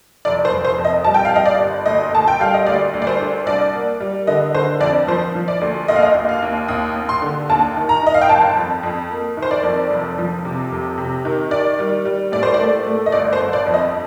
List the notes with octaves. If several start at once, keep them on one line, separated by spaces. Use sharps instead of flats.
F1 D5
C5
F1
C5
F2
D#5
G3 A5
G5
F5
G3 D#5
D5
G1
D2 D#5
D2 A5
G5
G3 F5
D#5
D2 D5
D2
D5
C5
D4
C2 D5
A#3
G3
D3 D#5
D3 C5
F2 D5
F3 C5
F3
D5
D2
D#2 D#5
F5
D#5
D#2
F5
D#2
D#2 D#6
D#2
C6
D3
D#2 A5
D#3
A#5
D#3 D#5
F5
G5
G1 A5
F2
F2
A#3
D#3
C5
D5
F2
F1
F3
C3
F1
C3
D#3
D#3 D5
G3
G3
A2 D5
C5
D5
A3
A3
D#5
G1 D5
C5
G1
D5
F2
D#5